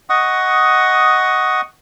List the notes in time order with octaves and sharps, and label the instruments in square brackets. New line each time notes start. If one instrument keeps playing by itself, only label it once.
[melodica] D#5 F#5 C#6 D#6